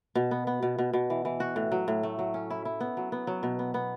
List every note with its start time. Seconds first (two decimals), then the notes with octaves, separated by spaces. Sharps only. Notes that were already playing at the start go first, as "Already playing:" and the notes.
0.15 B2
0.31 B3
0.47 B3
0.63 B2
0.79 B2
0.93 B2
1.10 E3
1.25 E3
1.40 F#4
1.56 A2
1.72 F#3
1.88 A2
2.03 A3
2.19 F#3
2.34 C#4
2.50 E4
2.65 E4
2.80 B3
2.97 F#3
3.12 B3
3.27 F#3
3.43 B2
3.59 B3
3.74 B3